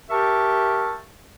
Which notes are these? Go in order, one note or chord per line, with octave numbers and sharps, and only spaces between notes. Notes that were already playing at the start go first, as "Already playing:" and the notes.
G4 A#4 E5 A5 C#6